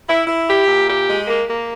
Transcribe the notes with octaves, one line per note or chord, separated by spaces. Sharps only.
E4
E4
G4
A#2
G4
G#3
A#3
A#3